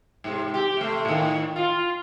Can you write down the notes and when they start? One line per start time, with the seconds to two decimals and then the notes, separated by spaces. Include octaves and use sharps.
0.24 G#2 C3
0.54 G4
0.77 C3 A3
1.05 A2 D#3
1.56 F4